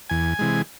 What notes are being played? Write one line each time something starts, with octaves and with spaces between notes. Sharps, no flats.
E2 G#5
C3 E3 G#3